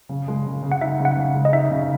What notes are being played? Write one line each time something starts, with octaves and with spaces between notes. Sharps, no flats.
C#3
G#3
C#3
C#3
F#5
D#4 E5
C#3
F#5
C#3
G#3
D#5
D#4 E5
C#3